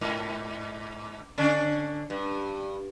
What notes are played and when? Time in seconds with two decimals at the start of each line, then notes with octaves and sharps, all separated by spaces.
0.01 G#2
1.38 D3 C#4 D4
2.10 G2